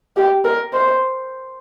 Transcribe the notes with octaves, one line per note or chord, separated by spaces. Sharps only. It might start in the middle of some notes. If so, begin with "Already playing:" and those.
G4
A#4
C5